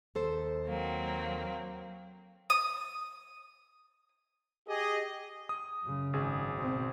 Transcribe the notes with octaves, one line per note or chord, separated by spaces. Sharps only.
D#2 A4 C5
F#3 A#3 C4
D#6
G4 G#4 D#5
D#6
F#2 C#3
G#1 G#4
B2 C4